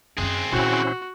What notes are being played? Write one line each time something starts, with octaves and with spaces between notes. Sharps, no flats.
F#2 C4 C#4 G#4 F#6
A#2 E3 C#4 E4 F#4 C5